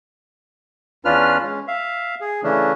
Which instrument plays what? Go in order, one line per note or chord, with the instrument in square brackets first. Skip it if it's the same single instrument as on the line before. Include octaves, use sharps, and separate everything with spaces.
[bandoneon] E2 C#4 D4 F4 B4 F6
G#3 C#4
E5 F5
G#4
C#3 E3 A3 C#4 D4